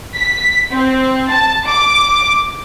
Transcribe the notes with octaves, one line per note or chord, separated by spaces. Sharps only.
B6
C4
A5
D6